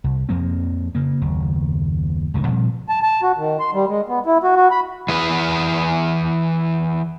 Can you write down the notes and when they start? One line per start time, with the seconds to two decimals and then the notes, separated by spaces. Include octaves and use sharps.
0.04 C2
0.29 F2 F3 A#3 C4
0.95 C#3 A#3
1.21 F#1 D#2
2.34 F1 C#2 C3 D#3
2.47 A#2 F3 G3 C4
2.89 A5
3.03 A5
3.23 F#4
3.37 D#3
3.60 C6
3.73 G3
3.88 G#3
4.08 B3
4.26 E4
4.43 F#4
4.57 F#4
4.71 B5
5.09 E3 G#4 B4